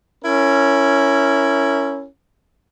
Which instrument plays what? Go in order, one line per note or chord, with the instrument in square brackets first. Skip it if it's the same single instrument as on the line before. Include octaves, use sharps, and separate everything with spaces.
[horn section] C#4 E4 A#4